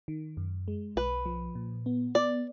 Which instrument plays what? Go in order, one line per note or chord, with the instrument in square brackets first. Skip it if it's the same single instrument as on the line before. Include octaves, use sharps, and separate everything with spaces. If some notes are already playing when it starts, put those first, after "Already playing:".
[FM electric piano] D#3
F#2
G#3
[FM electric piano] B1 [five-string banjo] B4
[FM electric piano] F3
A#2
B3
[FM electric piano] B3 [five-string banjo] D5